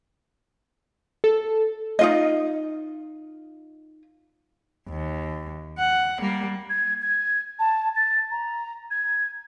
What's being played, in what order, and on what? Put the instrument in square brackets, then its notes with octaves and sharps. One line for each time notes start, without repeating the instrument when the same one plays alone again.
[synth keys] A4
[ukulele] D#4 F4 D#5
[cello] D#2
F#5
G3 A#3
[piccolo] G#6
G#6
A5
A6
A#5
G#6